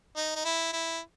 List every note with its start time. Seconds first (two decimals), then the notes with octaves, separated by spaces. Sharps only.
0.16 D#4
0.35 D#4
0.45 E4
0.73 E4